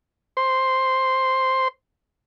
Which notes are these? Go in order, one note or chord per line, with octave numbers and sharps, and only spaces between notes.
C5 C6